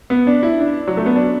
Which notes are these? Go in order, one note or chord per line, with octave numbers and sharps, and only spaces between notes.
B3
D4
E4
D4
F#3
A3
B3
D4